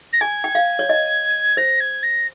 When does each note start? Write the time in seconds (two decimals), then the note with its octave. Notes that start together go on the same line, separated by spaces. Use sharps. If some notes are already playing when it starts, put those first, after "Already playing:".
0.13 A#6
0.21 G#5 G#6
0.44 G5
0.55 F5
0.79 C#5
0.89 D#5
1.57 C5 A#6
1.80 G#6
2.03 A#6